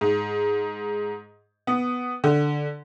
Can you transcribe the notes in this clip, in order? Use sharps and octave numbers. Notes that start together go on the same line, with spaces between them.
G#2
B3
D3